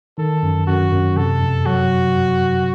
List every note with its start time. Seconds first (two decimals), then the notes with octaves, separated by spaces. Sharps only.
0.18 D#3 A4
0.43 F#2
0.67 F#2 F#4
0.92 F#2
1.17 C3 A4
1.41 F2
1.66 F#3 F#4